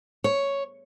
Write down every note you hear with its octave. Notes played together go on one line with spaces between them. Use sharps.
C#5